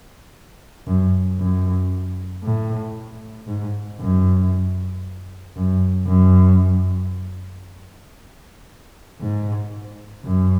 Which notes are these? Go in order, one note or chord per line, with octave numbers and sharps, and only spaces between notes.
F#2
F#2
A2
G#2
F#2
F#2
F#2
G#2
F#2